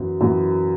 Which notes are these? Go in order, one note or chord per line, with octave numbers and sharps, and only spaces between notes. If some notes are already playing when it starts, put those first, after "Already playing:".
Already playing: F#2 E3 B3
F#2 E3 B3